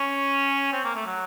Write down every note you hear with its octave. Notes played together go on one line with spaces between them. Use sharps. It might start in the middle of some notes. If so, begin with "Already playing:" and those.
Already playing: C#4
C4
A#3
A3
F#3